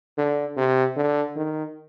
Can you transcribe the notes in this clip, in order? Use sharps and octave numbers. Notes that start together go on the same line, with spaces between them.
D3
C3
D3
D#3